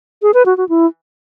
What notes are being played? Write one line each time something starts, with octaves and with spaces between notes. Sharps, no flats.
G#4
B4
F#4
F#4
E4